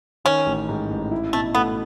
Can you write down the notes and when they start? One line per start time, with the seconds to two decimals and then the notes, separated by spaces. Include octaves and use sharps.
0.25 D#3 C#4
0.47 A1
0.69 G#2
0.91 A1
1.11 E4
1.33 B2 A3
1.55 A3 B3